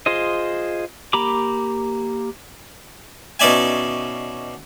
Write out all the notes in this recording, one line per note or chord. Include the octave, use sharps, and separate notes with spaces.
F4 G#4 C5 D#5
A#3 G4 A#5 B5 D6
B2 C#4 D#4 D5 E5 G#5